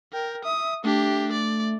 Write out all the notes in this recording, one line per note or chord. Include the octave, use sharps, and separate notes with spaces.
A#4 G5
E5 D#6
A3 D4 G4
D5